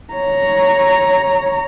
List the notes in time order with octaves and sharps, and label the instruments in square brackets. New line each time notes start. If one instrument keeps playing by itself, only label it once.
[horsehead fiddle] C#5 A#5